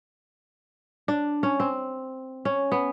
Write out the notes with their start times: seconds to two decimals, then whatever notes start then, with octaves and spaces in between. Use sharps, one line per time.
1.08 D4
1.43 C#4
1.60 C4
2.45 C#4
2.72 B3